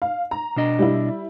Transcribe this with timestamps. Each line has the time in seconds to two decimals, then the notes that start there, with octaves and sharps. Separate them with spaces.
0.02 F5
0.31 A#5
0.56 B2 D4 D#5
0.79 G3 E4